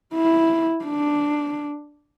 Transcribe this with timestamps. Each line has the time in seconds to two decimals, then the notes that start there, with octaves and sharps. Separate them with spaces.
0.14 E4
0.85 D4